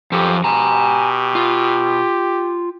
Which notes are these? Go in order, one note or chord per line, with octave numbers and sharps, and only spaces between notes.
F#2 F3 G4 A4
B2 G4 G#5 A#5
F4